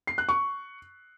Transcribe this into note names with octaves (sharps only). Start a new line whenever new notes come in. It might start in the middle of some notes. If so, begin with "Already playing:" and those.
C7
F#6
C#6